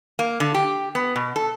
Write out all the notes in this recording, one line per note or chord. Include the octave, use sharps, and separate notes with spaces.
A#3
D3
G4
B3
B2
A4